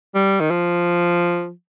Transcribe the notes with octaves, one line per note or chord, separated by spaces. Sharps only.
G3
D#3
F3